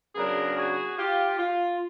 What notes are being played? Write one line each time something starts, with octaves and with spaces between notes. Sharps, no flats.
C#3 F#3 B3 D4 G#4 A#4
F#4 G#4
F4 G4
F4